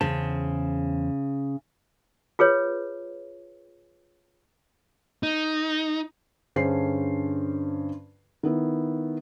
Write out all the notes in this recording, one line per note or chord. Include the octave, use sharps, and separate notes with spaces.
E2 C#3 C5 A5
F4 G#4 B4 C#5
D#4
G2 D3 C#4 G#4 C5 C7
D#3 B3 E4